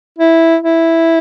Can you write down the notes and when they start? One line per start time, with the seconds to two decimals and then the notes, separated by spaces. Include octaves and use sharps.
0.19 E4
0.62 E4